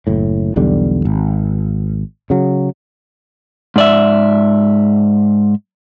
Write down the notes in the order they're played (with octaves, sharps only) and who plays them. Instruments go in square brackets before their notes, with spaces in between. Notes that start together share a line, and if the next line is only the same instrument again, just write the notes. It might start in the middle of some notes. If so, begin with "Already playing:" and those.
[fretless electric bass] F#1 A2
B1 E2 D3 G3
G#1
C#3 F#3
[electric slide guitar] G#2 D5 E5